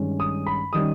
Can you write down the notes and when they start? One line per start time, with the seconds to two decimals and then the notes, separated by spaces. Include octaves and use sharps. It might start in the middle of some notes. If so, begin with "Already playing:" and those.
Already playing: G2 D#3 G#3 C#4
0.20 D#6
0.47 B5
0.73 D#3 G3 C#4 D#6